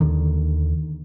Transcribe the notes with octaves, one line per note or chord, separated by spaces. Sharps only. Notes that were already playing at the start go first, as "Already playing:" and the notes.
D#2 D3 D#3